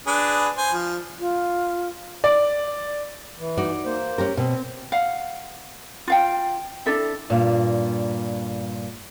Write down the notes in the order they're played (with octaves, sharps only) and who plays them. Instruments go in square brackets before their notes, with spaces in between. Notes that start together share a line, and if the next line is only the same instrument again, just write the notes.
[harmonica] D4 G#4 B4
C5 G#5
F3
[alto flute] F4
[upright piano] D5
[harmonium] E3
[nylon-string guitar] D#4 F#4 D5
[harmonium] A#3 C5
[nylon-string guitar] C#4 G4 A#4
[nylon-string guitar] B2 [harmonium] C4
[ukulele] F5 F#5
F4 F5 G5
D4 E4 A4 E5
[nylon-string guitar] G2 A#2